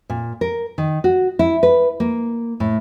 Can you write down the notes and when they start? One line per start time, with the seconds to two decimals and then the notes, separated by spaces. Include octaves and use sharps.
0.10 A#2
0.41 A#4
0.78 D#3
1.04 F#4
1.39 E4
1.63 B4
2.00 A#3
2.60 A2